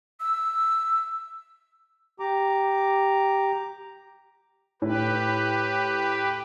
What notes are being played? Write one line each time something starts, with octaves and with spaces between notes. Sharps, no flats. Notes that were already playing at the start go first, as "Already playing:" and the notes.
E6
G4 A#5 D6
A2 G4 B4